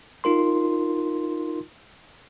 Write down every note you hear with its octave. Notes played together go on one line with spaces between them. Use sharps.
D#4 F4 A#4 C6